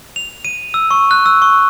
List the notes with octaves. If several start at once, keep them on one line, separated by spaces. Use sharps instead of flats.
F7
D#7
E6
C#6
F#6
E6
C#6